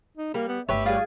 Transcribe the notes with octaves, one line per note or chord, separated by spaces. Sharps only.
D#4
G3 A#3
B3
G1 A3 G4 B4 C#5 E5
G3 F4 G#4